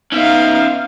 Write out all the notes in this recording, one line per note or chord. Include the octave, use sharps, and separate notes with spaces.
B3 C#4 D#4 E5 F5